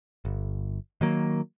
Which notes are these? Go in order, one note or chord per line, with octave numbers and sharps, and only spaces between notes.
G1
D#3 F#3 A#3